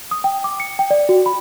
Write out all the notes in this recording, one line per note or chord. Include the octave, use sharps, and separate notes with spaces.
D#6
G5
D6
C#7
G5
D5
F#4
B5